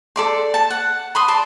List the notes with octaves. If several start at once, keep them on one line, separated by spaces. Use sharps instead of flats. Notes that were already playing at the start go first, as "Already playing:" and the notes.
A4 D5 C6
A5
F#5
B5 C6 D#6
D5 A5 C6